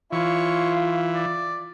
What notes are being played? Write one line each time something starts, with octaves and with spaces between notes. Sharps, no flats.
E3 F4 C#5
D5